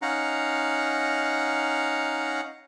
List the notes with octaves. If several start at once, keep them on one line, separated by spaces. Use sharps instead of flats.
C#4 D#4 F5 F#5 A#5